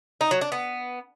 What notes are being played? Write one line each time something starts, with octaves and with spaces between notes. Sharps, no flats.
D#4
F#3
D4
B3